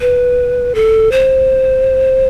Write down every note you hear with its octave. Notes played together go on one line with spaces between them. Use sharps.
B4
A4
C5